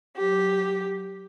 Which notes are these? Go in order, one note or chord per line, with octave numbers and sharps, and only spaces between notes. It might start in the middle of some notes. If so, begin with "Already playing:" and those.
F#3 G4